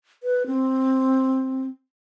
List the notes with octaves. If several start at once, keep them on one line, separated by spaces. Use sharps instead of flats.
B4
C4